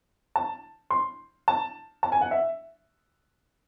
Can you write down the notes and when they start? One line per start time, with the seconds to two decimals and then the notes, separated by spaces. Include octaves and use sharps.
0.36 A5
0.90 C6
1.48 A5
2.03 A5
2.12 G#5
2.21 F#5
2.31 E5